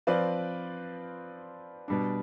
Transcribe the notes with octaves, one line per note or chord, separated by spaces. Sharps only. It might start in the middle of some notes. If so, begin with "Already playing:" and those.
F3 C4 F4 B4 D5
B2 G3 D4